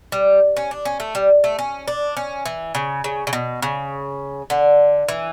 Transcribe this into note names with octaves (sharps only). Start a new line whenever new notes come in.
G3
C#4
D4
C#4
A3
G3
A3
C#4
D4
C#4
E3
C#3
C#3
C#3
B2
C#3
D3
E3